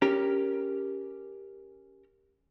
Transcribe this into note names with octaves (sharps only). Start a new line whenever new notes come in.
C#4 G4 A#4